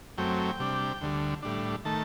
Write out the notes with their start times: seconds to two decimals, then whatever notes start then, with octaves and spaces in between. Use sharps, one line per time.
0.18 F#2 F#3 A3 C4 G5
0.59 C3 G3 D4
1.01 D2 D3 G3
1.43 A2 G3 D4
1.85 D#3 A3 A5